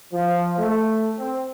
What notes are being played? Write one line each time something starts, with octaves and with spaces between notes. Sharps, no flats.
F3
A3
C4